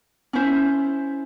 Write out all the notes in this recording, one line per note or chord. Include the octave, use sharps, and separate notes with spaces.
C#4 E4 C5 E5